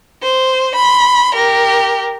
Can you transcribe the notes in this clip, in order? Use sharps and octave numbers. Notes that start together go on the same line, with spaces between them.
C5
B5 C6
G4 A#4